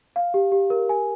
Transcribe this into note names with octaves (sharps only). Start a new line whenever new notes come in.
F5
G4
G4
A#4
G#5